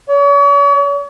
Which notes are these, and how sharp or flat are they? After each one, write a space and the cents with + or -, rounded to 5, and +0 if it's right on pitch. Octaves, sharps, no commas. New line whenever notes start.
C#5 +40